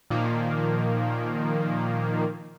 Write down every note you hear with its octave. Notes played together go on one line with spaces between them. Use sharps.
A#2 D#3 F3 A#3